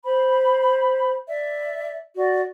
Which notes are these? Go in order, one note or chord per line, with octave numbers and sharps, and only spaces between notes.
C5 B5
D5 E5
F#4 D5